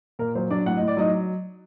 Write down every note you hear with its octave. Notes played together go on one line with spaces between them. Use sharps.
A#2 A#4
F#3 C5
F#3 D4 D5
A2 F#5
A2 D#5
D5
F#3 D#4 D#5